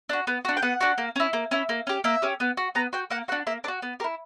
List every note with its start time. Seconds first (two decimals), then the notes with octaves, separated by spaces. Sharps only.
0.09 D4 F#4
0.27 B3
0.45 D4 F#4
0.57 G5
0.62 B3 F#5
0.81 D4 F#4
0.98 A#3
1.16 C#4 E4
1.33 A#3
1.51 C#4 E4
1.69 A#3
1.87 C#4 G4
2.04 A#3 E5
2.22 C#4 G4
2.40 B3
2.57 F#4
2.75 B3 A#5
2.93 F#4 G5
3.11 A#3 F#5
3.28 F#4 F#5
3.32 D4
3.47 A#3 E5
3.64 D4 D5
3.68 F#4
3.82 B3
4.00 G4 A#4
4.04 E4